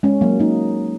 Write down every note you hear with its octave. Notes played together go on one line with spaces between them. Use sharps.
G#3 C#4
F#3 A#3
A#3 D#4